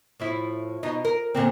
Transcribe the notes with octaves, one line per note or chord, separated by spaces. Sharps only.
A2 F3 E4
B2 D#4
A#4
A#2 D3 C4